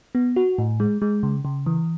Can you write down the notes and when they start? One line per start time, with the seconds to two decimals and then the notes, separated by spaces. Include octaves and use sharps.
0.15 B3
0.36 F#4
0.58 A2
0.80 G#3
1.02 G#3
1.23 C#3
1.45 C#3
1.66 E3